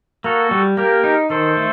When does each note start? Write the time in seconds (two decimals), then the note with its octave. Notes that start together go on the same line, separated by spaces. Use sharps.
0.24 A#3 F#4 A4
0.51 G3
0.77 A#3 G4 A#4
1.04 D#4
1.30 D#3 A4 C5
1.57 A3